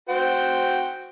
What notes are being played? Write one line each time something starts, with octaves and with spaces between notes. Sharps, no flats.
F#4 C5 G5